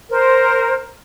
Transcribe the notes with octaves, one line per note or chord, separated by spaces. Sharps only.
A#4 C5